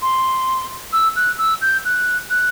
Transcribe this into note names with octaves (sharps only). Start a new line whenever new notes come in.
C6
E6
F#6
E6
G6
F#6
F#6